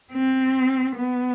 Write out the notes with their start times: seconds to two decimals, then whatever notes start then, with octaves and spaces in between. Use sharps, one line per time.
0.12 C4
0.95 B3